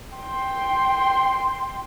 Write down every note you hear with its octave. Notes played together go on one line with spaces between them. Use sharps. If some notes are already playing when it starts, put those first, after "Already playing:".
G5 C6